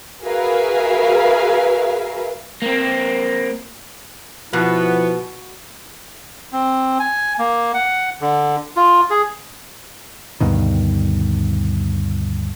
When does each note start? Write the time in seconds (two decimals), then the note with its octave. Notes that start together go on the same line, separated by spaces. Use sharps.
0.24 F#4 G#4 A#4 B4 E5 F5
2.62 A#3 C4
4.53 B2 F3 B3 E4 B4
6.53 C4
6.99 G#5
7.39 A#3
7.74 F#5
8.21 D3
8.76 F4
9.10 G#4
10.40 D2 G2 B2 D#3